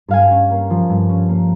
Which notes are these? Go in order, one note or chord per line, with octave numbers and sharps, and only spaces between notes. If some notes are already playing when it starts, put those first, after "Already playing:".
G2 F5 G#5
C#4
A#3
F3
G2
C#4
A#3